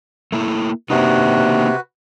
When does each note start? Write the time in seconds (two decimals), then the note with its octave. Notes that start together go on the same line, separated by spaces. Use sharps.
0.32 A3 A#3 E4
0.90 C3 A#3 D4 D#4 F#4 B4